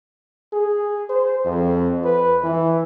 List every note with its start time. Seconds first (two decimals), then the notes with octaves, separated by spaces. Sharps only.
0.53 G#4
1.09 C5
1.45 F2
2.04 B4
2.44 E3